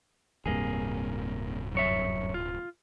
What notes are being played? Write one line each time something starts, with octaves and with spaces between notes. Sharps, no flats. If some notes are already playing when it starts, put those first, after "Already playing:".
D1 G2 C3 A#3 G#4
F#2 C#5 E5
F4